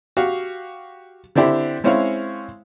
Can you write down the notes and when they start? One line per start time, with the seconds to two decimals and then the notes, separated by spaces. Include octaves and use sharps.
0.17 F#4 G4 F5
1.35 D3 C4 D4 E4 G4
1.84 G#3 C4 C#4 E4 C#5 F5